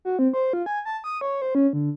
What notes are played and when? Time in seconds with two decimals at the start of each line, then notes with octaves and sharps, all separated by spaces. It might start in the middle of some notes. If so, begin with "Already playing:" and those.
0.05 F#4
0.19 C4
0.33 C5
0.53 F4
0.66 G#5
0.85 A5
1.04 D#6
1.21 C#5
1.42 C5
1.55 C#4
1.73 D3